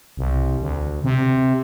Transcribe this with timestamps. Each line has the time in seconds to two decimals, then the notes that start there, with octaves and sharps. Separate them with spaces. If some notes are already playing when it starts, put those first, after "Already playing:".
0.17 C2
0.61 D2
1.04 C3